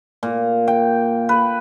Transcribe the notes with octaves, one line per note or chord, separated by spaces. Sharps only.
A#2
G5
B4